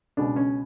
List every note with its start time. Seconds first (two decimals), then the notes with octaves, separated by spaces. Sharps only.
0.17 C#2 B2 G#3 D4
0.36 C#4